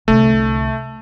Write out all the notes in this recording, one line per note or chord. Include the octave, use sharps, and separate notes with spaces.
C2 D3 A3